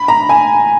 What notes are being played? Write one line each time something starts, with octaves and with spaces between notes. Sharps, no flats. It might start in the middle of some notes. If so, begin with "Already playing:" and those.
Already playing: B5
A#5
G#5